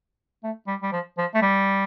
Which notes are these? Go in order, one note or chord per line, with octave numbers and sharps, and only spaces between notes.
A3
G3
G3
F3
F3
A3
G3